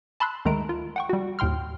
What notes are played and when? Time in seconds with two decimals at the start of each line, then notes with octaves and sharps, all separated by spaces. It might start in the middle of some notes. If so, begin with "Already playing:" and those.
0.20 A5 B5 C6 E6 F#6
0.45 D2 D#3 G#3 A3 A#5 D7
0.69 F4
0.96 F#5 G5 C#6
1.09 G3 F#4
1.39 D#2 A2 G5 C6 F6